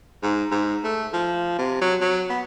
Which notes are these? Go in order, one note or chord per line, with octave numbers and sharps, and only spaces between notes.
G#2
G#2
A3
F3
C3
F#3
F#3
B3